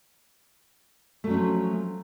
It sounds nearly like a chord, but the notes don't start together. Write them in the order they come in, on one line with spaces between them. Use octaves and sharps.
A3 F#3 C#4 F3